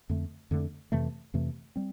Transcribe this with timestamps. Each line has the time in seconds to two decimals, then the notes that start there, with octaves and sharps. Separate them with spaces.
0.09 F2 D3 A3
0.51 F2 D3 A3
0.92 F2 C3 E3 A3
1.34 F2 C3 E3 A3
1.76 G3 C4